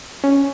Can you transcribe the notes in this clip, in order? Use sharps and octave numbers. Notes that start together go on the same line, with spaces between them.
C#4